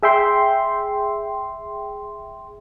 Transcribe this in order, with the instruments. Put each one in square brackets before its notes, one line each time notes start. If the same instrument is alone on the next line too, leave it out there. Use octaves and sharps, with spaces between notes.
[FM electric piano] G#4 E5 G5 C6